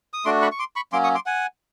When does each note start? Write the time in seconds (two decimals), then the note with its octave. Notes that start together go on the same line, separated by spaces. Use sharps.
0.13 D#6
0.25 A3 D4 F#4 C6 D6
0.42 B5 C#6
0.52 C#6
0.59 C6 D6
0.76 B5 C#6
0.93 F#3 A#3 C#4 C6 D6
1.04 C#6 D#6
1.15 C6 D6
1.26 F#5 G#5